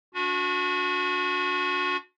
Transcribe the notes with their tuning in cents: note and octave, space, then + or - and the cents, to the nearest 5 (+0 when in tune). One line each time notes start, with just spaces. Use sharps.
D4 -35 F#4 -30